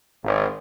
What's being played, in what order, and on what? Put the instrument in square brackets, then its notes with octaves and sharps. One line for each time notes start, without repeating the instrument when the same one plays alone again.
[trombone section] G#1